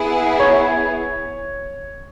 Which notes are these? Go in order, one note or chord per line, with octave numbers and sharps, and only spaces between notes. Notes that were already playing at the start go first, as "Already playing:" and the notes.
Already playing: B3 E4 G#4
C#5